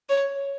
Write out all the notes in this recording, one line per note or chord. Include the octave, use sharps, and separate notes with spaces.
C#5